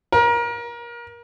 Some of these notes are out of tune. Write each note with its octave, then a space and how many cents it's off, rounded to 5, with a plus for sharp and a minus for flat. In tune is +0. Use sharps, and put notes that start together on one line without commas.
A#4 +25